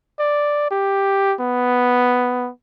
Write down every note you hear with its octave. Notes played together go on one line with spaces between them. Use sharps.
D5
G4
B3